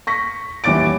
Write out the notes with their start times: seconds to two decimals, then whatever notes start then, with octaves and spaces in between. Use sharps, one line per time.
0.07 C#6 A#6 B6
0.64 D#1 E3 C#5 D6 A6 D7